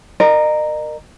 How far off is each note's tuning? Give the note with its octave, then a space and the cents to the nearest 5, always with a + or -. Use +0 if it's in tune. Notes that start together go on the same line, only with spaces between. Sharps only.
A#4 +0 D#5 -40